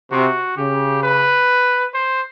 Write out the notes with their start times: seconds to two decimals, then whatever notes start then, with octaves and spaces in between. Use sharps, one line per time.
0.12 C3 F#4
0.57 C#3 G4
1.03 B4
1.94 C5